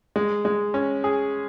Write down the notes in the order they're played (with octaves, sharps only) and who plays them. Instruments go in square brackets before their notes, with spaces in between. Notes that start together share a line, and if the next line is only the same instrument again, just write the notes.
[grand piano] G#3
G#3
C#4
G#4